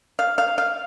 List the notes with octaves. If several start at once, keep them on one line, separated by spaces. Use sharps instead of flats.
F5
F5
F5